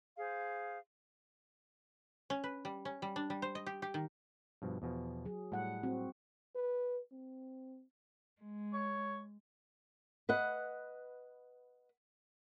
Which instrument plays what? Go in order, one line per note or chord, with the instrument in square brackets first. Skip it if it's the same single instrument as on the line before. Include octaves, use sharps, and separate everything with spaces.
[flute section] G#4 C5 F5
[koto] C#4
B4
G3
C#4
G3
D4
G3
C5
D#5
G4
G4
D#3
[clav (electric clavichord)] G2 B2 F3
E2 B2 F3
[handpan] F#3 G#4
[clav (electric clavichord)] A2 [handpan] G3 F#5
[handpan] C4 F#4
[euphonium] B4
C4
[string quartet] G#3
[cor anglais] C#5
[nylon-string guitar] B4 D#5 F#5